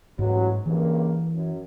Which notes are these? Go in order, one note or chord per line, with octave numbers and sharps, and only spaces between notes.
A1 G#2 F#3
C#2 G2 E3 A#3
F#2